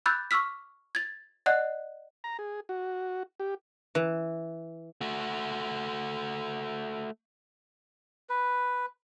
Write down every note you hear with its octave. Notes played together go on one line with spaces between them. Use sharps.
B5 D6 E6 F#6 G6 A6
C#6 D6 E6 F6 B6
G#6 A6
D5 D#5 F#5 F#6
A#5
G#4
F#4
G4
E3
A3 F#4
B4